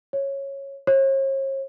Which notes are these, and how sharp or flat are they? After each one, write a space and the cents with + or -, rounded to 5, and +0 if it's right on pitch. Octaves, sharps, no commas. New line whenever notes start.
C#5 -10
C#5 -45